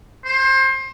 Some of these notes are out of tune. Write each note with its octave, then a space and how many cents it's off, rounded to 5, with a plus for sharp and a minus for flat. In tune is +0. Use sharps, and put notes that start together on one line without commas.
C5 +25